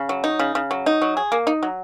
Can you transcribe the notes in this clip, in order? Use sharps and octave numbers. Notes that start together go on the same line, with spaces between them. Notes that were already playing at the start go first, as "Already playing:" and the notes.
Already playing: C#3
F#3
D#4
C#3
C#3
F#3
D#4
F#3
G#4
A#3
D#4
F#3